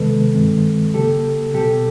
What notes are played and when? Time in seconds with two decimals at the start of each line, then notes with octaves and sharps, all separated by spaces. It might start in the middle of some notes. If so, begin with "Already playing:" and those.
Already playing: C3 D#3 G#3 B3 A4 B4
0.34 G2 D#3 G#3 C4
0.94 C#3 F#3 A#3 G4 A4
1.54 B2 F#3 B3 G4 A4